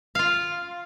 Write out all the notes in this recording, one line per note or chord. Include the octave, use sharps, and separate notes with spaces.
F4 F5